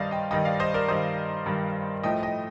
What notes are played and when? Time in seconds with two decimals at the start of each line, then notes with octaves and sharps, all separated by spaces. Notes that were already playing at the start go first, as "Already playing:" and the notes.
Already playing: G2 D#3 G3 C5 D5 D#5 F5
0.11 D#5 G5
0.31 G2 D#3 G3 D#5 G5
0.45 D5 F5
0.60 C5 D#5
0.74 A#4 D5
0.88 G2 D#3 G3 C5 D#5
1.46 G2 D#3 G3
2.03 A2 F3 A3 D#5 G5
2.23 D#5 G5